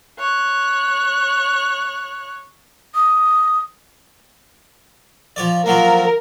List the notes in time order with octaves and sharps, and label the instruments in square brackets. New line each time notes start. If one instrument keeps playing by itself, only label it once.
[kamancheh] C#5 F#6
[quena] D#6
[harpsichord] F3 C#5 D5
[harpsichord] F3 F#3 A#3 [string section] A#4